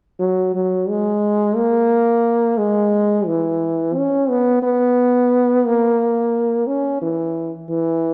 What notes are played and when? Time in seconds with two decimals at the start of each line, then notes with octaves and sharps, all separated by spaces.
0.20 F#3
0.55 F#3
0.89 G#3
1.57 A#3
2.58 G#3
3.26 E3
3.96 C#4
4.30 B3
4.63 B3
5.66 A#3
6.67 C#4
7.02 E3
7.69 E3